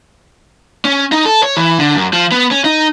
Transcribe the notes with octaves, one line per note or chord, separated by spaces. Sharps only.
C#4
D#4
A4
C#5
E3
D3
F#2
F3
B3
C#4
D#4